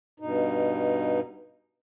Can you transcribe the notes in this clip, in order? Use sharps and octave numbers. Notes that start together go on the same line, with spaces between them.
G2 B2 D#4